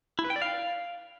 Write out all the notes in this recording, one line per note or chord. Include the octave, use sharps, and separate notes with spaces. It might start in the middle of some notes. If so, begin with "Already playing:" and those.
E4
B4
G5
D5
F5